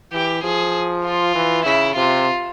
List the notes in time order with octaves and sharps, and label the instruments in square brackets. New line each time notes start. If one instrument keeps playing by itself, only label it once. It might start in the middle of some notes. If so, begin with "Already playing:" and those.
[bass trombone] E3 [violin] G4
[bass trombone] F3 [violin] G#4
[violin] F4
[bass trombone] E3
[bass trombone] C#3 [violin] E4
[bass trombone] C3 [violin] F4